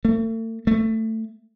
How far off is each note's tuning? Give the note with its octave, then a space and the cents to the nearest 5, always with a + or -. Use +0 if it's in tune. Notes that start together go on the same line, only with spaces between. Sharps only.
A3 +40
A3 +15